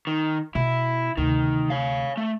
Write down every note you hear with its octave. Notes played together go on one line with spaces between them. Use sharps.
D#3
B2 E4
D2 C3 D#3
C#5 F5
A3